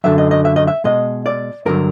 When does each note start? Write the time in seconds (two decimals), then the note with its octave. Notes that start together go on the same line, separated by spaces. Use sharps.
0.04 F#2 D3 F#3 E5
0.18 D#5
0.31 D#5
0.45 E5
0.56 D#5
0.67 E5
0.84 B2 G#3 D#5
1.26 D5
1.66 G2 D3 F#3 A#4